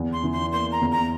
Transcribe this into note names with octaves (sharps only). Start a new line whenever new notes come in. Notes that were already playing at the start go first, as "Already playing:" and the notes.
Already playing: E2
C6
E3
C6
A#3 C6
A#5
E2
A#5